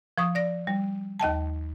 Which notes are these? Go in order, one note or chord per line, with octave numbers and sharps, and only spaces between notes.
F3 C#6 D#6
D5 A#6
G3
D#2 D#5 G5 A5